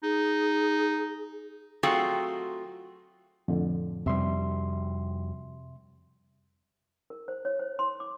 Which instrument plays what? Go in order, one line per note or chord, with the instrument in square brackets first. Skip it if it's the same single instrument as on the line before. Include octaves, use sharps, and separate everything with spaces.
[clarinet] D#4 [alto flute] G#4
[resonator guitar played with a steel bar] F#3 A3 C4 F4 F#4 G#4
[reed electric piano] F2 A2 D3
[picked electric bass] F2 G3 [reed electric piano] C3 E5 C6
[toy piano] A#4
C5
C#5
C5
C6
D6